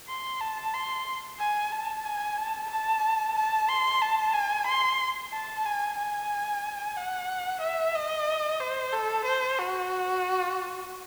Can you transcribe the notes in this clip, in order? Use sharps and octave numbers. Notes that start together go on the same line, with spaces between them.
C6
A5
C6
G#5
A5
G#5
A5
A5
A5
C6
A5
G#5
C6
A5
G#5
G#5
F#5
E5
D#5
C5
A4
C5
F#4